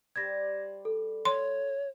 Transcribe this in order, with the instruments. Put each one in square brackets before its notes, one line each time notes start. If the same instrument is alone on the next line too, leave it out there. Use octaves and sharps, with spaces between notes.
[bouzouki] G3 C5 D5 [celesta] G#6 A#6
[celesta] A4
[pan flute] C#5 [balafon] C6